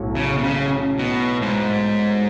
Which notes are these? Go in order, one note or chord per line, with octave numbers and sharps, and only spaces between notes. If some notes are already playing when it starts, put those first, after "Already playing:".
Already playing: B1 A2 F#3 A3
C#3
B2
C#3
B2
G#2